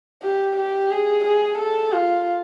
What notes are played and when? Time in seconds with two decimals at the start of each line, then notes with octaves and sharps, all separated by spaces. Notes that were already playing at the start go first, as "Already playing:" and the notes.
0.23 G4
0.57 G4
0.91 G#4
1.24 G#4
1.58 A4
1.92 F4